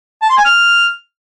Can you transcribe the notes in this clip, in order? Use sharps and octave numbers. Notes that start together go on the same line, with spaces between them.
A5
C6
G#5
F6